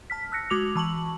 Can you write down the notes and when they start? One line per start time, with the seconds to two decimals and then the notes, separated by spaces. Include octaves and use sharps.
0.10 A5 F6 B6
0.32 E6 F#6 A#6 C#7
0.50 G#3 F#4 D6 F7
0.75 E3 A5 C#6 F#7